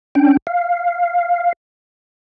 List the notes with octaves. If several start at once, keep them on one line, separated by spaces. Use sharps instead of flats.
C#4 D4 G5
F5